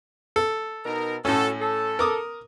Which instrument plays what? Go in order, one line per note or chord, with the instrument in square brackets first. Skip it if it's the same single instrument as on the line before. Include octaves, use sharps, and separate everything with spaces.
[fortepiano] A4
[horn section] B2 D#4 A#4
[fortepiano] A2 C#4 [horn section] F#4 A4
[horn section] A4
[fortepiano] A#4 D6 D#6